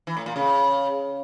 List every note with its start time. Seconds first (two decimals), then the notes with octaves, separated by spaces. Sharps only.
0.07 E3
0.17 A2
0.26 A#2
0.36 C#3